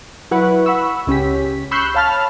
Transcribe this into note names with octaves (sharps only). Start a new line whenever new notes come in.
F#3 E4 B4 F#5 C#6
F#5 B5 C#6 E6
C#2 C#4 G4 B6
B5 C#6 E6 F#6 G6 C7
C#5 F5 A5 B5 F6